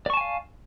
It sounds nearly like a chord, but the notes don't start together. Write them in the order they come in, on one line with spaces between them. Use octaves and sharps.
D5 C#6 A5 G#5 F5